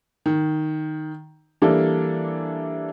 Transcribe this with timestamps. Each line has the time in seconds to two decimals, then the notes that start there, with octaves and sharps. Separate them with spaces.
0.26 D#3
1.62 E3 G3 A#3 D4 A4